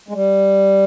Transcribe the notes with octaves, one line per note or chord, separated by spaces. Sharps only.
G#3
G3